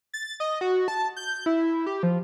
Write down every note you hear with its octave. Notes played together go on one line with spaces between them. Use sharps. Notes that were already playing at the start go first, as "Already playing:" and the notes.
A6
D#5
F#4
A5
G6
E4
G4
F3